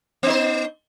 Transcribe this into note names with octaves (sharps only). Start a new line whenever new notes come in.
B3 D#4 C5